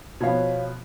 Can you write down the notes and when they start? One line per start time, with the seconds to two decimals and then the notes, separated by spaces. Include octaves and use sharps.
0.20 B2 F3 B3 C#5 F5